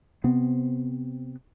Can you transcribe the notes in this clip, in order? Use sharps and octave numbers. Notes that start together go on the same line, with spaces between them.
C3 B3 C4